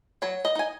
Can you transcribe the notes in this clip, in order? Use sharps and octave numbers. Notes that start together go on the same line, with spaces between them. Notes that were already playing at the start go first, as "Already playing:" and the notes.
F#3 C#5
D#5
D#4 G#5